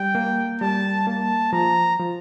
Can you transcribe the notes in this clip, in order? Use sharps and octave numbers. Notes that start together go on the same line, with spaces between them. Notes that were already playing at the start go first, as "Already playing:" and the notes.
Already playing: G3 G5
A#3
G3 A5
A#3 A5
F3 A#5
F3